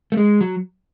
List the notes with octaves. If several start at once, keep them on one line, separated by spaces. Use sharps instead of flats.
A3
G#3
F#3